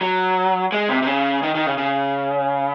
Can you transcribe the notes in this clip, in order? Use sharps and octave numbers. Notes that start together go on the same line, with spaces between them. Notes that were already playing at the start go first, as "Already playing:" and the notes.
F#3
G#3
C3
C3
C#3
D#3
D#3
C#3
C#3